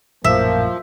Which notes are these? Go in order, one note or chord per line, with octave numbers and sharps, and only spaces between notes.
A#1 F#2 A2 F3 A#3 E5